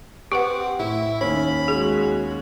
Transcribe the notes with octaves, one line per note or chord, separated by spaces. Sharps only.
C4 G4 B4 F#5 C#6
A2 E4
D#2 C#4 B5
G#3 F#4 G#4